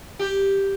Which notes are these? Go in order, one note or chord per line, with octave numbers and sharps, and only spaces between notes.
G4